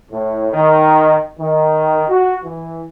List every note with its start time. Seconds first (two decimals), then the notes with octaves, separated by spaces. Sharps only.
0.11 A2
0.52 D#3
1.39 D#3
2.09 F#4
2.44 E3